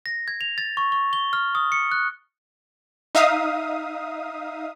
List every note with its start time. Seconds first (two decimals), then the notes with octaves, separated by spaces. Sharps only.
0.06 A#6
0.28 G#6
0.41 F7
0.58 A6
0.77 C#6
0.92 C#6
1.13 G7
1.33 F6
1.55 D#6
1.72 C#7
1.92 F#6
3.15 D#4 E5 F5 D#6